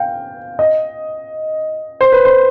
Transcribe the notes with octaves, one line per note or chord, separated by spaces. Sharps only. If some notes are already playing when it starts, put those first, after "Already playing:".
Already playing: F5 G5
D#5
C5
B4
C5